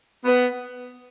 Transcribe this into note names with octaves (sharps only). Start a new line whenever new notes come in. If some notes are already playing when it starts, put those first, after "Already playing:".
B3